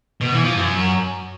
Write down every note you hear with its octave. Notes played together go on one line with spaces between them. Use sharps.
B2
E3
F3
F#2